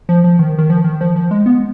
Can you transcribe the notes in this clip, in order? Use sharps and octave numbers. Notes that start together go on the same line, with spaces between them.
F3
F3
D#3
D#3
F3
D#3
F3
F3
G#3
B3